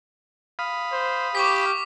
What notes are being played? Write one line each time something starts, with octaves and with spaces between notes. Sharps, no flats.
F5 B5 D#6
C5
G4 C#6 D6 B6